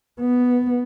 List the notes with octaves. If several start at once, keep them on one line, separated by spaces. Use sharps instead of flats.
B3